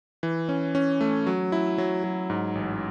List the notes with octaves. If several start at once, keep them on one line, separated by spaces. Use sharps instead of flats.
E3
C#4
C#4
A3
F#3
E4
F#3
F#3
G#2
A1